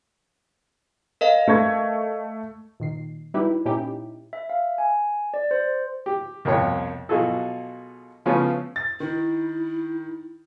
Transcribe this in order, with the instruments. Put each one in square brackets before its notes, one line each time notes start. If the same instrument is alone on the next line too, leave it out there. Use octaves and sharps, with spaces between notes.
[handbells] A#4 D#5 F5
[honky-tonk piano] A3 C#6 G#6
[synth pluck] A#2 D#3 C7
G3 D#4 E4 F#4 G4 B4
A#2 C#4 D#4 E4 G4
[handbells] E5
F5
G#5
D5
C5
[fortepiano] G4
C2 F2 B2 A#3 C#5
B2 F#3 F4 F#4 G#4 A4
C#3 F3 A3 B3 C#4
[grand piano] A6
[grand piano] D#3 [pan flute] E4